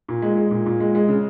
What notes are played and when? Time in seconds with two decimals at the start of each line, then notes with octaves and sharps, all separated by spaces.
0.09 A#2
0.22 G#3
0.37 G#3
0.51 A#2
0.66 A#2
0.80 G#3
0.95 G#3
1.08 C#3